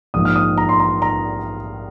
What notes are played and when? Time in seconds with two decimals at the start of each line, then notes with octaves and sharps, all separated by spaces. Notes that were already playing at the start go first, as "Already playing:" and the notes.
0.14 A#1 G#2 F3 A#3 D#4 D#6
0.25 F6
0.36 D#6
0.57 A#5
0.69 C6
0.80 A#5
1.02 A#5